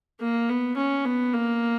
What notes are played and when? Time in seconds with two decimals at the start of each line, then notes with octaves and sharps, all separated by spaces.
0.21 A#3
0.50 B3
0.77 C#4
1.05 B3
1.33 A#3